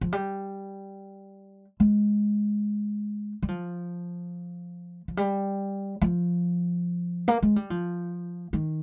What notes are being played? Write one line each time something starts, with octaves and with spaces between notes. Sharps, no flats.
F3
G3
G#3
G3
F3
F3
G3
F3
A#3
G#3
G3
F3
D#3